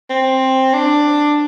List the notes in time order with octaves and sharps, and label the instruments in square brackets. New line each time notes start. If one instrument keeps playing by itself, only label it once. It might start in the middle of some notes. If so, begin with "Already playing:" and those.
[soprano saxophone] C4
D4